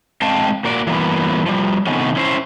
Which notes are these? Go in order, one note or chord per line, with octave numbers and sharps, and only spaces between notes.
G#3 C4 F5 G5 A5
A#3 F#4 D5
E3 F#3 G3 A#3 B3
F3 G3
C3 D#3 A3 B3 C#4
C#4 E4 C5